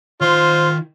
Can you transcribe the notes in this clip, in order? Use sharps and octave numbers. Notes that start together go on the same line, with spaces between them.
D#3 F4 C5 C6